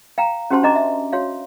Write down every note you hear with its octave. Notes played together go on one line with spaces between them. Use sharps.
F5 G5 A#5
C#4 F#4 G4 C5 A5 C6
D4 D#4 D#5 A#5 D6
E5
F#4 C#5 F5